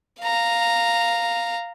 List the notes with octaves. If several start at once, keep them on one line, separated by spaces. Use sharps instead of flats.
F5 A#5